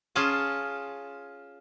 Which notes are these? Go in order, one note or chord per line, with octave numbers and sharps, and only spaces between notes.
C#4 F4 G#4 A5